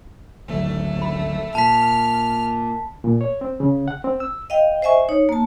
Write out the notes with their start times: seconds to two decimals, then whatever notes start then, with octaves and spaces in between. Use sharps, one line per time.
0.48 G#1 D2 F#3 A3
1.02 B5
1.55 A#2 A5 F6 B6
3.04 A#2
3.21 C#5
3.41 C4
3.60 C#3
3.88 F#5
4.04 C4
4.20 E6
4.50 D#5 F5 G5
4.82 C5 D#5 E5 G#5 C#6
5.09 D#4 C#5
5.29 A#3 A5